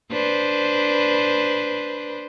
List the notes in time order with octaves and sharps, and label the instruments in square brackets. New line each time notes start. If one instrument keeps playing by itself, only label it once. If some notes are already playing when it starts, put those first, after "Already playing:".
[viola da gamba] D4 B4 C5